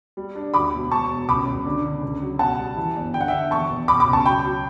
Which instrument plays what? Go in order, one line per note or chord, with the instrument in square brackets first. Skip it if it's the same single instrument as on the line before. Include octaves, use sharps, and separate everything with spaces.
[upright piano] G3
D4
D2 B5 D6
E1
E1 A5 C#6
E1
C#2 B5 D6
C#2
D3
D3
C#2
F#3
B1 F#5 A5
G3
E3
G1
D3 G5
F#5
D3 E5 G5
E2 A5 C#6
E2
B2 B5 D6
B5 D6
C#2
A5 C#6
F#3 G5 B5
F#3